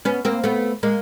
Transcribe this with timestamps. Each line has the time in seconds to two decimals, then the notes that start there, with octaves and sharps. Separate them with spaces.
0.05 B3 C#4
0.25 A#3 C4
0.44 A3 B3
0.83 G#3 A#3